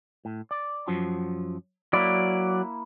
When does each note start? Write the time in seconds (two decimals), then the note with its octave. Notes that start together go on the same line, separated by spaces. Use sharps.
0.25 A2
0.51 D5
0.88 F#2 F3 F#3
1.93 F#3 A#3 E4 D5